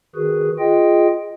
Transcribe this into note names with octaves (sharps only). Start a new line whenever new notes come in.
D#3 F#4 G#4 B4
F4 G#4 D#5 G5